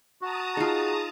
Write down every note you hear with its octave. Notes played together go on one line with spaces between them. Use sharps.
F#4 A5 A#5 D#6
D#4 F4 G#4